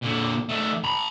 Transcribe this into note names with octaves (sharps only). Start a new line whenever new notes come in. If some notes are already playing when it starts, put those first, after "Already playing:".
A#2 D3
D#3 A3
A#5 B5